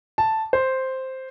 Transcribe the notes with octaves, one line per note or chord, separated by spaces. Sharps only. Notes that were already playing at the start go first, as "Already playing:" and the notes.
A5
C5